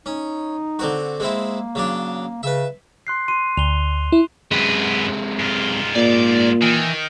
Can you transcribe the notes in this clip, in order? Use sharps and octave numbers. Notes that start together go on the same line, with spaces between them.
C#4 D#4
D3 C4 F#4
G#3 A#3 C4 E4
C#3 F#3 D4
C#3 B4 E5
C6 F#6 C7
C6 D#7
D2 F7 G7
E4
F#2 C3 G#3 B4
G#2 F4
A#2 D5
D#3 E3